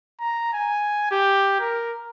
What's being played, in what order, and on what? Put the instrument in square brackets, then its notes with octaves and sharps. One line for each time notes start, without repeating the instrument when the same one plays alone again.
[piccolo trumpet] A#5
G#5
G4
A#4